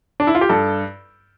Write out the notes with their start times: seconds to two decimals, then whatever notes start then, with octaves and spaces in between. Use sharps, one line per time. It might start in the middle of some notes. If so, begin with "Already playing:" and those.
0.20 D4
0.27 E4
0.35 F4
0.41 G4
0.49 G2 A4